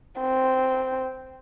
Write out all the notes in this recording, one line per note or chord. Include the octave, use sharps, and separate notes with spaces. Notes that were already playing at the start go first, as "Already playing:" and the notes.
C4